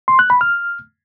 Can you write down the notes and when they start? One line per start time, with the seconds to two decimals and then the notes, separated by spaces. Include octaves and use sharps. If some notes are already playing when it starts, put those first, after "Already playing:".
0.08 C6
0.19 F#6
0.30 B5
0.41 F6